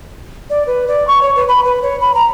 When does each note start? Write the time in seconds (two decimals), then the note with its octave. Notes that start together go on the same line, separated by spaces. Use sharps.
0.50 D5
0.67 B4
0.88 D5
1.07 C#6
1.22 C#5
1.36 B4
1.48 B5
1.64 B4
1.82 C#5
2.01 B5
2.15 A#5